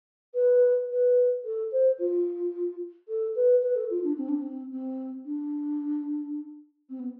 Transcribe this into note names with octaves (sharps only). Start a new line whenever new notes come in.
B4
B4
A4
C5
F4
A4
B4
B4
A4
F4
D4
C4
D4
C4
C4
D4
C4
B3